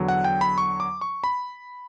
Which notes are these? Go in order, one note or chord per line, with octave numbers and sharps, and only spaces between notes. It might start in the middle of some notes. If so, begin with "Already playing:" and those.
Already playing: E2 D3 F#3
F#5
G5
B5
C#6
D6
C#6
B5